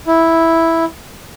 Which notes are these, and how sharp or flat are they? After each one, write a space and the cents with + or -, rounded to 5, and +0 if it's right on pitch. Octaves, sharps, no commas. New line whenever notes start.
E4 -5